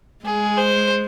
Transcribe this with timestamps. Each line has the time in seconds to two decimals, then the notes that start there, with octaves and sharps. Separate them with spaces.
0.25 G#3 G#4
0.57 C5